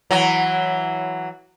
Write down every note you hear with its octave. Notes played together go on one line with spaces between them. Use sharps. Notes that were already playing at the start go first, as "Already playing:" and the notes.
E3 F#3